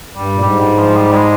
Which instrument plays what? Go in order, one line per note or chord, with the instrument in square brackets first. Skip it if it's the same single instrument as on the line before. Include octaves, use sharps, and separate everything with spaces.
[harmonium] G2 [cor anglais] G3
[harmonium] A#2
[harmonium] G#2 [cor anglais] G3
[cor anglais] G3
F3
G3
G3
G#3